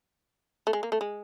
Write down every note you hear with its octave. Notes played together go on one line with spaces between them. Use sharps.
A3
G#3
A#3
A3
G#3